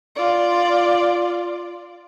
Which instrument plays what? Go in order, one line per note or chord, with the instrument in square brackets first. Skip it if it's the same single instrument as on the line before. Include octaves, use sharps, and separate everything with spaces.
[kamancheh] F4 D5